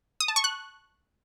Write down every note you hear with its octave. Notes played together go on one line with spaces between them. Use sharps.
D#6
A5
C#6
F#6